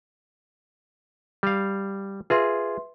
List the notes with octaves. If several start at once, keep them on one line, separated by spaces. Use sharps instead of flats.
G3 F5
F4 G#4 B4 E5 C6